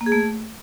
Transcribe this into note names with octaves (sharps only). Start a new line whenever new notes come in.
A#3
G#4
A3